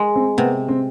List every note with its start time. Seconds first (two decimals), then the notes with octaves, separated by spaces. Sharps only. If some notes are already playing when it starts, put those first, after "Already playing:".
Already playing: G#3
0.16 C4
0.38 C3 B3
0.69 C4